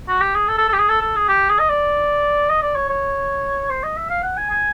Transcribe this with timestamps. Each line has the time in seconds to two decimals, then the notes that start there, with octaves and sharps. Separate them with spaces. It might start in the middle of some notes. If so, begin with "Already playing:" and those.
0.09 F#4
0.21 G4
0.35 G#4
0.48 A4
0.58 A4
0.69 A4
0.73 G4
0.79 G#4
0.89 A4
1.02 A4
1.16 G#4
1.29 G4
1.49 G#4
1.59 D#5
1.69 D5
2.50 D#5
2.62 D5
2.75 C#5
2.90 C#5
3.70 C5
3.84 D#5
3.97 E5
4.10 F5
4.23 F#5
4.37 G#5
4.50 G#5